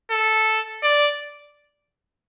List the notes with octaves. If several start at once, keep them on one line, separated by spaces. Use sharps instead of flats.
A4
D5